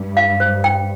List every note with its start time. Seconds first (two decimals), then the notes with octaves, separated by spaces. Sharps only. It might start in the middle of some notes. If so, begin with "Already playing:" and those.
Already playing: G2
0.17 F5
0.40 C5
0.64 G5